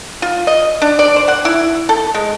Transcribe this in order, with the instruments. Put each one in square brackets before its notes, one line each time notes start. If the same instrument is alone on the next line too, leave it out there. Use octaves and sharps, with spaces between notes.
[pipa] F4
D#5
D4
D5
C5
F#5
E4
A4
G#3